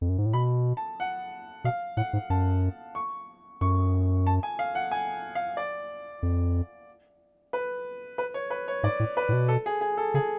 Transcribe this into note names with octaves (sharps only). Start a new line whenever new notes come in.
F2
F#2
G#2
A2
B2 B5
A5
F#5
B2 F5
A2 F#5
G#2
F#2 A5
C#6
F#2 C#6
A5
G#5
F5
F#5
G#5
F5
D5
F2
B4
B4
C#5
B4
C#5
G#2 D5
A2
B4
A2
B2
A4
G#4
G#4
A4
C#3 G#4